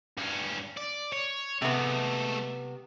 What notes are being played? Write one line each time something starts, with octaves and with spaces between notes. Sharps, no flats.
G2 C#4
D5
C#5
C3 G#3 A3 B3